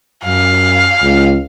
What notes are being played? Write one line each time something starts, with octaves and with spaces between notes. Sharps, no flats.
F#2 F5
C#2